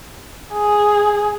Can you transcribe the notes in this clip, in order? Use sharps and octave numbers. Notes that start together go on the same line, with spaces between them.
G#4